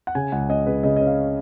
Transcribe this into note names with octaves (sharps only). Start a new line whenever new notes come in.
F#5
C#3 G#5
C#2 F#5
C#4 D#5
C#3 B4
C#3 D#5
C#4 D#5
F5